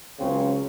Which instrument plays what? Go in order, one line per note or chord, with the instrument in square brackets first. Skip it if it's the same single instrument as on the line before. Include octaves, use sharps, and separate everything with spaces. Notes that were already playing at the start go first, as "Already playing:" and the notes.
[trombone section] C#2 C#3 F#3 C4